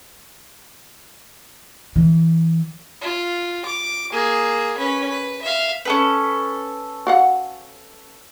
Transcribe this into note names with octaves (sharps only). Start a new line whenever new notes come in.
E3
F4
D6
A#3 G#4
C#4 B4
B4
E5 F5
C#4 A4 B4
F#4 F5 F#5